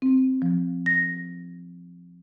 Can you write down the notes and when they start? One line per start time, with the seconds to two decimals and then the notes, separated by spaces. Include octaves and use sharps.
0.02 C4
0.42 F3
0.86 A#6